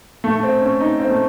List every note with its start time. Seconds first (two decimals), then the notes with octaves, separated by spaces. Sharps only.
0.24 A3
0.35 A3
0.43 C4
0.62 C#4
0.80 D#4
1.00 C4
1.10 A3